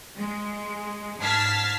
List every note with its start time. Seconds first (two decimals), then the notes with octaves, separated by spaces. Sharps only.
0.17 G#3
1.20 G#2 A5 F6 G#6 B6 C7